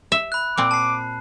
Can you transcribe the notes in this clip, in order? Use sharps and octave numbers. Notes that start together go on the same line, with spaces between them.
E5
B5 F#6
A#2 C4 D6
A5 C7